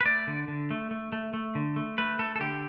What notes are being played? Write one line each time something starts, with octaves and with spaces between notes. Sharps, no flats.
B4
A3 D5
D3
D3
A3
A3
A3
A3
D3
A3
A3 B4
A3 A4
A4
D3 G4